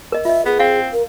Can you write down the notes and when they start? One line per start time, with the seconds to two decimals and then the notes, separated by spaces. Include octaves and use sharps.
0.12 A#4 D#5
0.25 F4 D#5 E5
0.46 B3 G#4
0.59 C4 F5
0.93 A#4